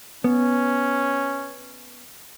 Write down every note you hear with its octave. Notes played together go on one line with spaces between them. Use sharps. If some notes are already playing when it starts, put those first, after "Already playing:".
B3 C#4